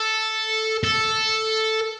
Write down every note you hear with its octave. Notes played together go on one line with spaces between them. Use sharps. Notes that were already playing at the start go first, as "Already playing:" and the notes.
Already playing: A4
A4